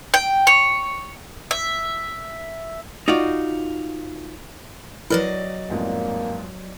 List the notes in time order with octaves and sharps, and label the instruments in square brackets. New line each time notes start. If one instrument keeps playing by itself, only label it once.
[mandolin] G5
C#5
E5
[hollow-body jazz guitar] D#4 F4 F#4 D5
[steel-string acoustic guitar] F#3 D5 D#5 [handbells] E4 A#4 B4
[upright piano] A1 F2 G#2 [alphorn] A#3